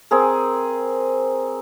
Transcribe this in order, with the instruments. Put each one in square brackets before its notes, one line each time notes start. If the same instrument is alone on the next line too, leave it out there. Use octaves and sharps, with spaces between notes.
[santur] C4 G#4 A#4